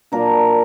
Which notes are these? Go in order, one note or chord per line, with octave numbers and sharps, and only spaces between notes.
A#2 F#3 A#3 D4 A#4